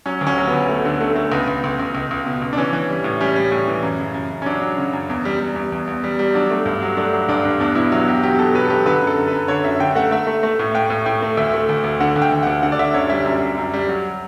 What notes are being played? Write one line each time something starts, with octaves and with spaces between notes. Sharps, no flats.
F#3 C#4
D2
C#4
F#3
B3
D2
A3
D3
A3
A3
C#2 B3
C#2
C#2
C#2
C#2
C#2
B2
C#2
D4
E3 C#4
E3
G3
A2
G3 C#4
G3
A2
E3
F#2
C#3
F#2
F#2
C#4
F#3 D4
F#3
C#3
F#2
E2
G3
G3
E2
E2
E2
G3
G3
F#3 D4
A3
G2
F#3
A3 D4
F#3
G2 D4
G2
E2 D4
B2 E4
F#3 E4
B2 G4
F#3 G4
B2 A4
F#3 B4
A4
F#3 G4
D3 B4
F#2
A4
F#2
B4
F#2
D3 C#5
F#2 E5
D3 G5
A3 F#5
A3 E5
A3
A3
A2
A2 G5
A2
A2 G5
A3
D2 E5
A3
D2
D2
D3 F#5
D2
G5
D2
D2 F#5
D3 F#5
D5
D3 E5
F#2 C#5
G3 E5
F#2
F#2
F#2
G3
F#3